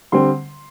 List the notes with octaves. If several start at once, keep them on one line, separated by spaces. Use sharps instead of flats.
D3 G3 C4 C6